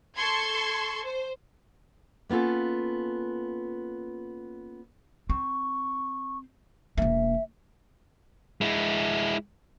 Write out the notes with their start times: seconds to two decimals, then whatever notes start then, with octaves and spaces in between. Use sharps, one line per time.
0.18 A4 A5 C6 C#6 G#6
1.03 C5
2.29 A#3 B3 C#4 F4 A4
5.30 C4 C#6
6.98 E1 A#3 E5
8.61 G#3 E4